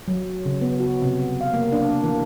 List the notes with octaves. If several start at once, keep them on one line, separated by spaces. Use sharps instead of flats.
F#3
C#3
B3
F#4
C3
F5
A#3
D4
E3